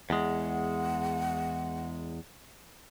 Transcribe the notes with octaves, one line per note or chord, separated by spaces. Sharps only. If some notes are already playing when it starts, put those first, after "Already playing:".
E2 G#3 F#5